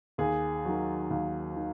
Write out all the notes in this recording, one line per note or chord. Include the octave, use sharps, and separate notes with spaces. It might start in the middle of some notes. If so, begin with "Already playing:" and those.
D#2 G#4
D#3 F#3
D#2
D#3